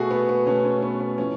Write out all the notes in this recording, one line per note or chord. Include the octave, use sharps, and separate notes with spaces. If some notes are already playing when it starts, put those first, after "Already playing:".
Already playing: B2 A3 F#4 G#4 A4
B3
B3
B2 A3 C#4
C#4
B3
B3
A2 F3 A3 C#4